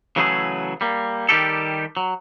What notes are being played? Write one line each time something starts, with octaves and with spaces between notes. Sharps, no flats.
C#3 E3 F#3 A3 E4 G#4
G3 A#3
D#3 G3 G4 A4
F#3